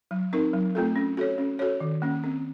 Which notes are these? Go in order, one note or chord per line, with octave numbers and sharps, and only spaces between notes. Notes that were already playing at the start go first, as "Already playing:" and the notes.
F#3
C4 D#4 A#4
F#3
A3 C4 F4 A4
C#4
F#4 A4 C#5
C#4
F#4 A4 C#5
D#3
A#3 C#4
C4